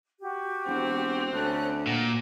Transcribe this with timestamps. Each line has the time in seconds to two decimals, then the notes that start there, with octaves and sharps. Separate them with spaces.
0.21 F#4 G4
0.66 E1 C4
1.32 D2 C#4 A4 F#6
1.87 A#2 F#5